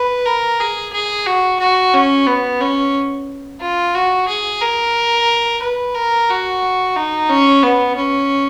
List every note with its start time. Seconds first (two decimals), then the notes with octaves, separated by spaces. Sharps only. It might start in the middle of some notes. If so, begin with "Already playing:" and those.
Already playing: B4
0.26 A#4
0.60 G#4
0.93 G#4
1.26 F#4
1.60 F#4
1.94 C#4
2.27 B3
2.61 C#4
3.61 F4
3.95 F#4
4.28 G#4
4.62 A#4
5.62 B4
5.95 A#4
6.29 F#4
6.96 D#4
7.29 C#4
7.63 B3
7.96 C#4